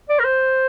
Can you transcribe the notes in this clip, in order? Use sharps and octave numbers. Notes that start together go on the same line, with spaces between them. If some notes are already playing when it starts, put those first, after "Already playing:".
D5
A#4
C5